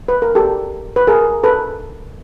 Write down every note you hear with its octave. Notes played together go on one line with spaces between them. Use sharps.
B4
A#4
G4 A4
B4
G#4 A#4
A4 B4